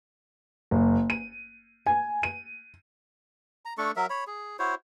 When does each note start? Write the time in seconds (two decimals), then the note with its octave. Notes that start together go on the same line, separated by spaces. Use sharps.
0.71 F#1
1.10 D#7
1.87 G#5
2.23 D#7
3.65 A#5
3.78 A3 D4 A4 C#6
3.96 F#3 A#4 E5
4.10 C#5 B5
4.27 G#4
4.59 E4 F#4 C5 C#5